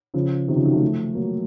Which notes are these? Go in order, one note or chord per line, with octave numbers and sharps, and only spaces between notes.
C#3 F3
C3 D#3
C#3 F3
D#3 F#3
F3 A3
F#3 A#3